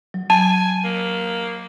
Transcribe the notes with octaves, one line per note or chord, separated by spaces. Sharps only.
F#3
G#5 A5
A#3